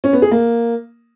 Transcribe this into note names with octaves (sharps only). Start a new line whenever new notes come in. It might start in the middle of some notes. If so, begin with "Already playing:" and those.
C#4
B3
G#4
A#3